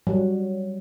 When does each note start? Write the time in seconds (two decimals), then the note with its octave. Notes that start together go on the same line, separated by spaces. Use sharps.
0.07 F#3 G3